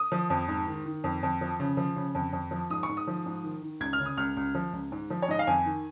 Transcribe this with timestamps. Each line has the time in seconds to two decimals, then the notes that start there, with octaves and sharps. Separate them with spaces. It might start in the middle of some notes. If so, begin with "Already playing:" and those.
Already playing: D#6
0.12 F3
0.30 F2
0.48 G#2
0.67 D#3
0.86 D#3
1.04 F2
1.23 F2
1.41 F3
1.60 C#3
1.77 F3
1.96 C#3
2.15 F2
2.33 F2
2.51 F3
2.70 G#2 D#6
2.83 C#6
2.89 G#2
2.97 D#6
3.07 F3
3.26 G#2
3.44 D#3
3.62 D#3
3.81 C#2 G#6
3.93 F6
3.99 C#3
4.06 D#6
4.17 C#2 F6
4.37 C#2
4.55 F3
4.73 C#2
4.92 G#2
5.10 F3
5.22 C#5
5.28 G#2 D#5
5.39 F5
5.47 F2 G#5
5.65 D#3